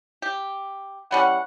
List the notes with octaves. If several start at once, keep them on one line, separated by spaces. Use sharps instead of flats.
G4
E3 G3 C#4 F#5